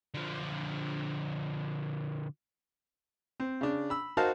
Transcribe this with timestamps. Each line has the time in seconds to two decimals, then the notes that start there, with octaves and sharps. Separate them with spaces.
0.14 D3 F3
3.40 C4
3.61 C#3 D4
3.90 B5 E6
4.17 D#4 F#4 A#4 C5 F5 A5